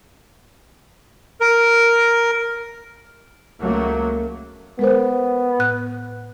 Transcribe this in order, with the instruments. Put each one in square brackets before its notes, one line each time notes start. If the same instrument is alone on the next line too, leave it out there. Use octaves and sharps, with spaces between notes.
[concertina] A#4
[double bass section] C#2 F#3 A3 A#3
[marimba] G#3 A#4 C5 [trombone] B3
[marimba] A2 F#6